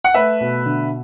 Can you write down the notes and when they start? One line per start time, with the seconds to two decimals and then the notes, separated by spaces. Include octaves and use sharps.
0.04 F#5
0.14 A3 B4 E5
0.40 B2
0.66 D3